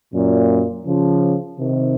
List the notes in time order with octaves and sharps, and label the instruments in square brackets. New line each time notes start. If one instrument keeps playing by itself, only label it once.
[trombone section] F#2 A#2
C#3 F3
C3 D#3